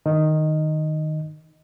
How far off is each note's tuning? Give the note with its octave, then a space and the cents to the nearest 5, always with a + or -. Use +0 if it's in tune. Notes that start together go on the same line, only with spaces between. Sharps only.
D#3 -5 D#5 +0